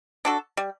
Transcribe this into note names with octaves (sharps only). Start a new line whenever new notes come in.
D4 F#4 A4
G3